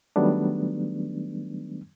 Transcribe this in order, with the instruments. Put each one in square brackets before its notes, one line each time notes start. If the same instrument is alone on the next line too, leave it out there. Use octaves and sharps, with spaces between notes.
[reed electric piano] D#3 F#3 G3 A3 B3 D4